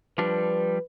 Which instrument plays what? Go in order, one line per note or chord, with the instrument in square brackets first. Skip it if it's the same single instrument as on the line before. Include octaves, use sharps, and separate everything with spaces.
[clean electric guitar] F3 G3 D4 [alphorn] B4